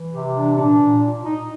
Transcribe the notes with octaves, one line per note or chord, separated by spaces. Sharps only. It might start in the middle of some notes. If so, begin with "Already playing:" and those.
Already playing: E3
C3 G4
E3 D4
C#4
A#2 D4
A#2
A#2
A#2 D#4